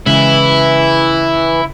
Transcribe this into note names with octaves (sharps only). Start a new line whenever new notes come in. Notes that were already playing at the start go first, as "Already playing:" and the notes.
C#3 E3 G#3 E4